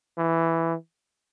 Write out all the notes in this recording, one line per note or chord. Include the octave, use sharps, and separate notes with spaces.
E3